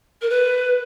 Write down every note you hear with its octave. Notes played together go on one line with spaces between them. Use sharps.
A#4
B4